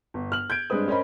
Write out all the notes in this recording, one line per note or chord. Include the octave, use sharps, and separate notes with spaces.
G1
F6 F#7
G6 G#6 D7
G2 G#3 C4 B4 D#6
C#4 A#4 C5 D#5 B5